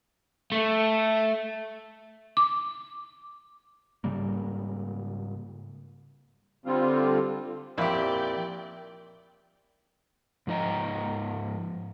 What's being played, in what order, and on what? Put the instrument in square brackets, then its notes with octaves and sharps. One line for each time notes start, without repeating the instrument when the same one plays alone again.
[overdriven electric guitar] A3
[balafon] D6
[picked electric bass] G#2 C#3 G3 A#3
[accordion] D3 G3 C4 F4
[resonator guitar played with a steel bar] F2 [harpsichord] A#2 G4 [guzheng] E4 [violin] D5 G5
[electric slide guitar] G#2 F3 D#4 D#5 A#5